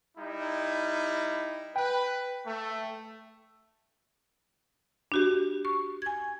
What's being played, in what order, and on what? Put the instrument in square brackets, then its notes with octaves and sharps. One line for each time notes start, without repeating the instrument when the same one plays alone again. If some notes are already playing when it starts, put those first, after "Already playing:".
[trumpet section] G3 D#4 E4
[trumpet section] B4 [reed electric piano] G5
[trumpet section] A3
[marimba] D4 F#4 G4
C#6
G#5 G#6